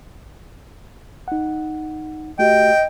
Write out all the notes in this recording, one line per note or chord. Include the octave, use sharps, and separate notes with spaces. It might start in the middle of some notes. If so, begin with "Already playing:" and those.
D#4 F#5
A3 F#4 G4 D#5 G5